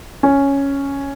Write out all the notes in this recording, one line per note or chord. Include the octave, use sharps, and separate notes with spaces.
C#4